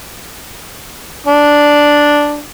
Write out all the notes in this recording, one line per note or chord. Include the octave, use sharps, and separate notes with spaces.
D4